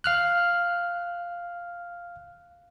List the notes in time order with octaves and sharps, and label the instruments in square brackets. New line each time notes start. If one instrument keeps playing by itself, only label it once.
[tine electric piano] F5 F6 F#6